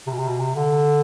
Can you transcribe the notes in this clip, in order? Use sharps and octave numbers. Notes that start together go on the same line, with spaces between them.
C3
B2
C3
B2
C3
D3